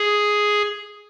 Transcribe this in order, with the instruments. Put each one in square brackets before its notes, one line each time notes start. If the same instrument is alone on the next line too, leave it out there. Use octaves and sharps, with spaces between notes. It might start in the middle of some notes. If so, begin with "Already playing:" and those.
Already playing: [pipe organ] G#4